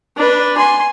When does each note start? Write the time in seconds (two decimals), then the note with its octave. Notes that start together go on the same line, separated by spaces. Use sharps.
0.17 D4 B4
0.57 G#5 C6